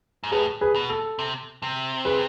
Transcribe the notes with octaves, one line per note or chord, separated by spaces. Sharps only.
G#2
A2 G#4 B4
G#4 B4
B2
A4
C3
C3
G#4 B4